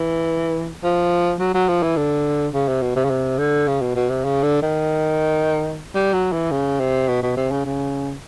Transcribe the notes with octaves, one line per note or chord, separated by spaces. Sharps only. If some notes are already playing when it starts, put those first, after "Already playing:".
Already playing: E3
F3
F#3
F#3
F3
E3
D3
C#3
C3
B2
C3
C#3
C3
D3
C#3
B2
B2
C3
C#3
D3
D#3
G3
F#3
E3
C#3
C3
B2
B2
C3
C#3
C#3